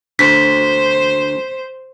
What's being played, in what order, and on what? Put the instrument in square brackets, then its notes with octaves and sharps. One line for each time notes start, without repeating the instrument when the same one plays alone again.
[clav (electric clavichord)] D2 [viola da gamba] C5 [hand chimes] B6